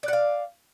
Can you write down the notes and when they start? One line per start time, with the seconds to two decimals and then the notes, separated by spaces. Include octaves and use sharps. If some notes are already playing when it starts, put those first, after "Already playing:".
0.03 D5
0.08 F#5
0.13 F5